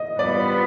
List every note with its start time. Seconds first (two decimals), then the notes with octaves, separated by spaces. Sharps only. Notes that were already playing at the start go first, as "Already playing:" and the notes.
Already playing: D#5
0.19 G3 B3 F4 B4 D5